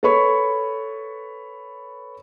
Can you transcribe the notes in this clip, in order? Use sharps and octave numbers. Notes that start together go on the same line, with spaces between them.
A4 B4 C#5 B5 C#6